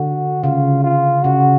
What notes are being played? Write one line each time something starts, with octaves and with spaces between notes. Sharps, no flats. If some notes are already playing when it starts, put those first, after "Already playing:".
Already playing: D3 F#4
C#3 F4
F4
C#3 F#4